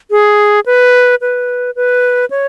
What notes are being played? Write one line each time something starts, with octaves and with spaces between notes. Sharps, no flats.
G#4
B4
B4
B4
C#5